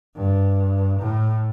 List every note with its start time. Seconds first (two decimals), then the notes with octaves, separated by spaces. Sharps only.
0.16 G2
1.00 A2